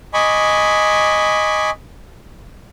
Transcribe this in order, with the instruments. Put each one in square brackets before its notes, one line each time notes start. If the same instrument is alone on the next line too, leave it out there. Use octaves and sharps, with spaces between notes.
[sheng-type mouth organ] D#5 G#5 B5 C#6 D6